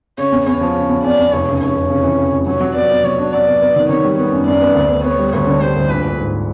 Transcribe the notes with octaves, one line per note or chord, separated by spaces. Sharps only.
C#3 C#5
E2
E2 C#5
F3
C#3
E2
E2 D5
E2
F1 C#5
C#3
F1 C#5
F1
C#3
E3
C#3
F1
F#3 C#5
F#3
B3 D5
B3
F#3 C#5
D4
F#3 D5
B3
B3
D#3
D#3 C#5
G3
B3 C#5
F#2
F#2 D5
B3
D2
B3
B3 C#5
G3
D2 C#5
D3
G3 C5
D2
A#1 B4
A#1
G#2